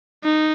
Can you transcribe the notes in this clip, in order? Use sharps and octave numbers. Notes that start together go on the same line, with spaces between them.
D#4